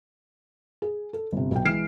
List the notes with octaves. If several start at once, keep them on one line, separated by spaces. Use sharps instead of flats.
G#4
A4
G1 C3
B1 G5
E3 G#3 F6 C7 D7 E7